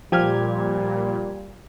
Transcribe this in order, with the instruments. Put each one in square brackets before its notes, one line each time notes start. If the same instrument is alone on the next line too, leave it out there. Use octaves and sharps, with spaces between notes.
[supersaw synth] A#2 [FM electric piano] F3 G#6 [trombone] G3 [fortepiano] G4 F6